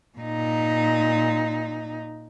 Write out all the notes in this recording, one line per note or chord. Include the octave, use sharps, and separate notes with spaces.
A#2 D#4